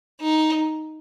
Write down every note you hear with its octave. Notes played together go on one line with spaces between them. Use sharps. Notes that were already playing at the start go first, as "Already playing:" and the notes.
D#4